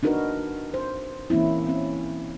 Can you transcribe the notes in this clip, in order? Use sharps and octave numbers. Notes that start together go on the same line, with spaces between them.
D4 D#4 F#4 A#4 B4
C5
E3 A#3 C4 C#4 E4
C4 C#4